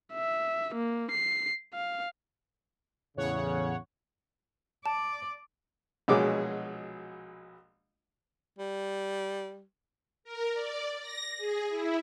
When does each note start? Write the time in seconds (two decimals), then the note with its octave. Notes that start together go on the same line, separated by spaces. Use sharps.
0.13 E5
0.75 A#3
1.11 C7
1.73 F5
3.17 E2 A2 C#3 C#5 F#5
4.86 D5 A5
6.08 A#1 B2 F#3 G#3 G#4 D6
8.58 G3
10.24 A#4
10.53 D5
11.00 A#6
11.37 G#4
11.69 E4